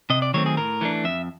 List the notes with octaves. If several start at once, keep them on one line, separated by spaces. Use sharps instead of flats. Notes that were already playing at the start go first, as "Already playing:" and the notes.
C3 D#5
D5
D#3 F#3 A3 C4 C#5
G#4
A2 A#4
E3 A3 D4
F2 E5